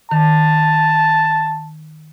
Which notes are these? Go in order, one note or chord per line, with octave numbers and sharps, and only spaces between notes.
D#3 A5